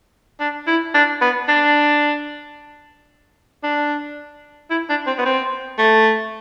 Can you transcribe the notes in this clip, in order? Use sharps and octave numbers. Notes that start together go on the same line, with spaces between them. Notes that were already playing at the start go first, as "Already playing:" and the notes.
D4
E4
D4
B3
D4
D4
E4
D4
C4
B3
C4
A3